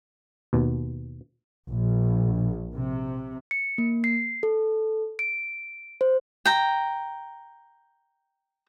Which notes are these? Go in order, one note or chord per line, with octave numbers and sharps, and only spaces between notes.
D#2 B2
A#1
C3
C#7
A#3
C7
A4
D7
C5
G5 A#5